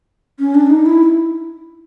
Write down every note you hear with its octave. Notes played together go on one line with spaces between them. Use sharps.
C#4
D4
D#4
E4